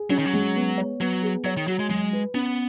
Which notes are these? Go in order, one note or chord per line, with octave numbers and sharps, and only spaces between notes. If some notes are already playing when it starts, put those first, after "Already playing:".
Already playing: G#4
F#3 C#4
D#3
F#3
G#3
B3
C#5
F#3 B3
G#4
F#3 C#5
D#3
F#3 F#4
G#3
F#3 G#3
B4
B3 C#4